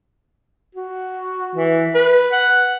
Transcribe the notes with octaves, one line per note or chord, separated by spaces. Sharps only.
F#4
E3
B4
F#5